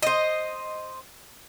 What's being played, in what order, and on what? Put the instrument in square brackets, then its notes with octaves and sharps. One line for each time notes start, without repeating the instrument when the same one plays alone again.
[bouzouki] C5 D#5